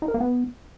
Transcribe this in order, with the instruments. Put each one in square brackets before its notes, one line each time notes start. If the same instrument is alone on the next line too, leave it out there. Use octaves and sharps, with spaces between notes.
[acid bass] D#4
A#4
A#3
B3